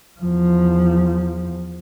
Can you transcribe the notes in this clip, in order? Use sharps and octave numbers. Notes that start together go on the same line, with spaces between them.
E2 F3